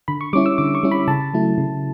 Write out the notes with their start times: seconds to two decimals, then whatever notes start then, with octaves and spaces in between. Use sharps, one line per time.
0.08 D3 B5
0.21 C#6
0.33 G3 C#4 E4 D6
0.46 E6
0.58 D3 D6
0.75 C#6
0.83 G3 C#4 E4
0.91 B5
1.08 C#3 A5
1.34 F#3 A3 E4
1.58 C#3